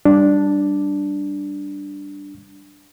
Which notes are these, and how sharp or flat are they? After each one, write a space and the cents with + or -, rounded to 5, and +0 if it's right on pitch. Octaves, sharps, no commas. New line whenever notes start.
G3 +0 D4 +0